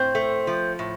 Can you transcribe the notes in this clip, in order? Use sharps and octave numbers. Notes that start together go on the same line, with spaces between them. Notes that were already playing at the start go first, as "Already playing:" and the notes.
Already playing: A2 C4 C5
A3
F3
A2